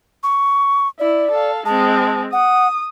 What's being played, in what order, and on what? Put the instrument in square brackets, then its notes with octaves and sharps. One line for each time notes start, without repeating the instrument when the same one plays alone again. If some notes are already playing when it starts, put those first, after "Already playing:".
[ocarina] C#6
[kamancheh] E4 [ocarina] D5
[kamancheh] A4 F5
[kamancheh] G#3 C4 [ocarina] A5
[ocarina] F#5 [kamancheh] D#6